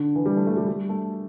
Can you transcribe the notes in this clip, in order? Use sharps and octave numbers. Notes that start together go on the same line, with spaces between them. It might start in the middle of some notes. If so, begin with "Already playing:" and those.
Already playing: D3
E3
G3
A3
A3
G3
G3
A3